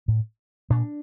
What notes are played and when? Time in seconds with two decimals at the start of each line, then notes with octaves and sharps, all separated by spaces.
0.08 A2
0.70 A#2 D4